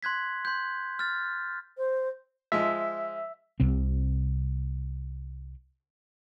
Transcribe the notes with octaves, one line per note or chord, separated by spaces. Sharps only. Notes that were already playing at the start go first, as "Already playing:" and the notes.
C6 F#6 G#6 B6
C6 G6
F6 A6
C5
F3 G#3 E5
C2 C3 C4